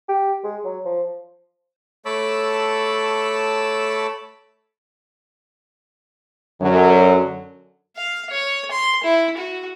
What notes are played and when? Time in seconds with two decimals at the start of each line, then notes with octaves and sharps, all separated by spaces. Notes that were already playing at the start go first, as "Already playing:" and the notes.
0.09 G4
0.44 G#3
0.65 F#3
0.85 F3
2.06 A3 C#5 A5 B5 D6 E6
6.61 F#2 D3 F#3
7.96 F5
8.30 C#5
8.71 C6
9.03 E4
9.37 F#4